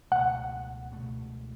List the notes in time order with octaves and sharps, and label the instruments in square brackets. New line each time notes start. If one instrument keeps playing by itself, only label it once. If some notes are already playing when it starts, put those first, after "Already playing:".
[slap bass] C#2 B2 A3 [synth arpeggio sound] F#5
[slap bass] C#2 B2 A3